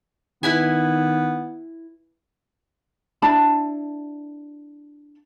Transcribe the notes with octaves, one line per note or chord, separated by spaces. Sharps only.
D#3 B3 E4 B4 G#5
D4 E4 A5 B5